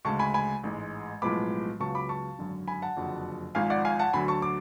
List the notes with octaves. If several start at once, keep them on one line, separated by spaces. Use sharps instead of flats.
D2 C#3 G#3 A5 C#6
G#5 B5
G#5 B5
A1 G#2 G#3
B1 A2 F3 G#3 B3 B5 D6
C#2 C#3 F#3 B3 A5 C#6
B5 D6
A5 C#6
G#1 F#2 D3
G#5 B5
F#5 A5
F#1 F2 D3 F#3
G#1 G#2 F3 F5 G#5
D5 F#5
F5 G#5
F#5 A5
D2 D3 F#3 G#5 B5
A5 C#6
D6